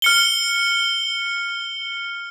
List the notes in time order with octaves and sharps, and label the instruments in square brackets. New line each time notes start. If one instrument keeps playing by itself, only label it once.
[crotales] F6 C#7 G7